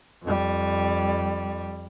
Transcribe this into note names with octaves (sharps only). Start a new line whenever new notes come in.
F2 G3